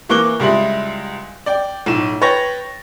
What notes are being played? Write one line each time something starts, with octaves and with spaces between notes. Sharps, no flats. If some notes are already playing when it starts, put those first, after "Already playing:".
E3 A#3 C#6 D6 F#6 G7
C#2 G3 G#3 E4 C6 F#7
D5 G5
B1 A2 E7
B4 C#5 G5 C#6 A6 A#6